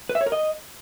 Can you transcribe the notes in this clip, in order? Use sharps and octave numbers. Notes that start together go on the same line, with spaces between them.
B4
E5
C#5
A#4
D#5